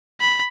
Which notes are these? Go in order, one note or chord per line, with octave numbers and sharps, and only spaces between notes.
B5